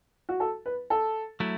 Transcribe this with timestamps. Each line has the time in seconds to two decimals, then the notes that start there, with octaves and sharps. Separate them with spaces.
0.29 F#4
0.40 A4
0.66 B4
0.90 A4
1.40 F#3 A3 E4